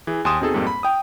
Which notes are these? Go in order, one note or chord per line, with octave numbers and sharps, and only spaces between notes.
E3 G#4
D#2 G#5 C6 D#6 E7
B2 C4 D#4 G#4 A4
F2 G#2 G3 A#3 C4
B5
G5 D#6